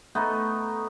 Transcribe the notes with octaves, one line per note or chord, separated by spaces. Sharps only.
A3 B3 D#4